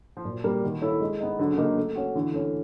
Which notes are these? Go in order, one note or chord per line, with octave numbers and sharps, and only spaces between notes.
F3
A#2 F#3
G3 A#3
D#3 B3
E4 A4 C#5
G#3
B3 D#4
D3 F#3
C#3
A#3 D#4
D3
A3
C#4 F#4
D3 E3
A3 C#4